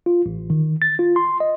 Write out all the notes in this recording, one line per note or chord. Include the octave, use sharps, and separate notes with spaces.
F4
A1
D#3
A6
F4
C6
D#5